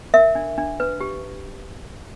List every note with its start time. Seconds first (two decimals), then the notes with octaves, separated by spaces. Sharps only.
0.14 A#4 E5
0.35 D4
0.58 D4
0.80 B4
1.01 G4